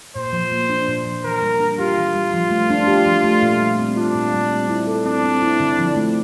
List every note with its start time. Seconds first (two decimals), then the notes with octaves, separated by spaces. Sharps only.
0.15 A#2 C5
0.33 F3
0.52 A#3
0.70 D4
0.88 A#2
1.05 F3
1.24 E3 A#4
1.43 G3
1.60 D4
1.79 F4 G4
1.97 E3
2.15 G3
2.34 F3
2.51 A3
2.70 D4
2.87 G4
3.06 F3
3.24 A3
3.42 A#2
3.60 G3
3.79 C4
3.96 D4 F4
4.15 A#2
4.34 G3
4.51 C4
4.69 E4
4.87 A4
5.05 C4 D4
5.24 C4
5.42 E4
5.60 D3
5.78 F3
5.96 A3